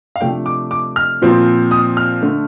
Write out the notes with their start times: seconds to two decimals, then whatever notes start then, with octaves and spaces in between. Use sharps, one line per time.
0.16 F5
0.21 C3 F3 A3 D4 G5
0.46 D6
0.71 D6
0.96 F6
1.22 A#2 F3 C4
1.71 D#6
1.97 F6
2.22 D3 A3